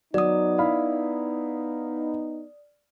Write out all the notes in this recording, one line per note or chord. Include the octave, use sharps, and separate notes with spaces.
F#3 B3 D#4 D5 D#6
E4 F5 B5